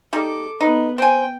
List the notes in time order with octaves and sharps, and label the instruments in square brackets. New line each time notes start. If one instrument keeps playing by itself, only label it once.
[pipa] G3 D#4 [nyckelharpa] A4 D6
[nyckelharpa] B3 B4 [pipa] D#4
[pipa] C4 G#5 [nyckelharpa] G5